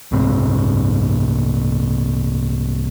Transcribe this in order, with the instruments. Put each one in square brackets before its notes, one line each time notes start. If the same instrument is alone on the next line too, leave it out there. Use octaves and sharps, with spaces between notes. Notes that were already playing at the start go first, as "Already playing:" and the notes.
[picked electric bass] C2 G#2 C4